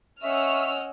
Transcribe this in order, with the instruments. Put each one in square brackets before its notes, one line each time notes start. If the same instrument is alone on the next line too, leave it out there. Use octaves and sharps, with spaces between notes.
[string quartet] C#4 [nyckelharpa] D#5 F#5 [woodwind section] E5 C#6 [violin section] E6 F6